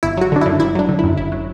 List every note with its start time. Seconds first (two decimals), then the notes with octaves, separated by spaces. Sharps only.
0.03 G1 E4
0.17 F#3 F#4
0.32 D3 D4
0.41 E4
0.46 F#2
0.60 G1 E4
0.75 F#3 D4
0.89 D3
0.99 E4
1.04 F#2
1.17 G1 E4
1.32 F#3